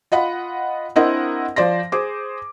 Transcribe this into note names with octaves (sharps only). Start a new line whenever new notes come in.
F4 D#5 F#5 B5
C4 D4 E4 A#4 D#5 F#5
F3 C5 D5 C6 A#6
G#4 C5 D6